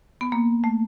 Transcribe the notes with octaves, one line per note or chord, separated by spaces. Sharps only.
B3
A#3
A3